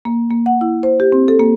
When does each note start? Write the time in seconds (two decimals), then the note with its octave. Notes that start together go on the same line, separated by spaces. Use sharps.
0.05 A#3
0.30 A#3
0.46 F#5
0.61 E4
0.83 C5
1.00 G4
1.12 C4
1.28 A4
1.40 A#3